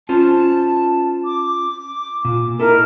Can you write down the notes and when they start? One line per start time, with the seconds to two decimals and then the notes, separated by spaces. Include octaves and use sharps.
0.09 C#4 F4 C5 A5
1.25 D6
2.25 A#2
2.60 D#4 E4 A4 A#4